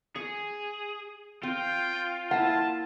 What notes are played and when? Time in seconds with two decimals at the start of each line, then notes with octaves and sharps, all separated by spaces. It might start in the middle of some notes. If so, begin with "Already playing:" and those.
0.16 G#4 C#6
1.43 C4 F4 G5
2.31 A#3 E4 F#5 A5